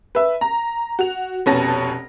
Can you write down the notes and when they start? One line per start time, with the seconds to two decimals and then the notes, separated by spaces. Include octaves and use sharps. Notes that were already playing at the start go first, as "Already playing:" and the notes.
0.15 B4 E5
0.41 A#5
0.99 F#4 F7
1.46 F1 B2 C#4 A5 A#6